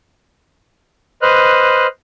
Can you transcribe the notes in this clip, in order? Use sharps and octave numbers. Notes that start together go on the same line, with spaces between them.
B4 C5 D#5 F6 F#6